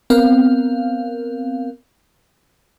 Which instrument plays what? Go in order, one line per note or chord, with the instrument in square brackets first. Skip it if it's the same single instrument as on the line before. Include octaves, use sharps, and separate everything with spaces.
[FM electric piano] B3 C4 A#4 F5